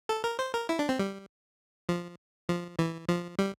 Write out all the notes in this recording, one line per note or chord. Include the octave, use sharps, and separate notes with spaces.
A4
A#4
C5
A#4
E4
D4
C4
G3
F3
F3
E3
F3
G3